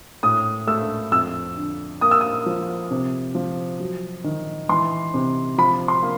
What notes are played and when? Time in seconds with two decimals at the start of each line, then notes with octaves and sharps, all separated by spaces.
0.23 A2 D#6
0.67 A3 E6
1.12 F2 E6
1.57 D3
2.01 A#3 D#6
2.11 E6
2.21 D#6
2.46 F3
2.91 C3
3.35 F3
3.80 F#3
4.24 D#3
4.69 E3 C6
5.14 C3
5.58 F3 B5
5.88 C6
6.02 A#3